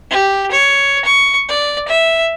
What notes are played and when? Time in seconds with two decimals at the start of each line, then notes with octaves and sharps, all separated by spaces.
0.10 G4
0.51 C#5
1.05 C#6
1.49 D5
1.88 E5